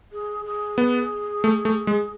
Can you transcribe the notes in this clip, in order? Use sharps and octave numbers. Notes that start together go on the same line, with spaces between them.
G#4
G#4
B3
A3
A3
G#3